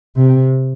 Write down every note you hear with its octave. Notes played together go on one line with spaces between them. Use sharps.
C3